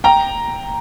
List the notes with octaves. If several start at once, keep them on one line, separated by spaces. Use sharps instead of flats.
G5 A#5